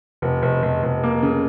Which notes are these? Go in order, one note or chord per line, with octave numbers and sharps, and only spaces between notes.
F1
F1
F1
F1
A#3
C#3